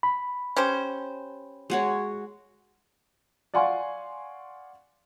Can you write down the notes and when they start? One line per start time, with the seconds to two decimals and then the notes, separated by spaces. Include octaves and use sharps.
0.03 B5
0.56 C#4 G4 C5
1.70 G#3 F#4 C#5
3.54 D5 F5 F#5 G#5 C6 C#6